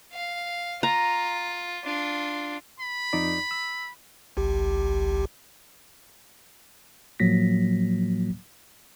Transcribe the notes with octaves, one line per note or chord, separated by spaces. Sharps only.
F5
F4 A#5
D4 F4
B5
F2 D#4 D5
E6
G#1 C#2 G4
A2 F3 F#3 A#3 A#6 B6